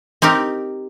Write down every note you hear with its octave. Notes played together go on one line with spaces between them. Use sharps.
C4 D#4 G4 A#4